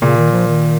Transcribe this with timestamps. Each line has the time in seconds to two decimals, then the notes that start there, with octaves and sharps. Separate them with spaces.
0.02 A#2 C#3
0.17 D#3
0.32 F3
0.48 D#3